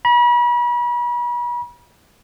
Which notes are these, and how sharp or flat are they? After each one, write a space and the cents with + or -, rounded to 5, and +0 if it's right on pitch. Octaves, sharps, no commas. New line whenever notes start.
B5 -40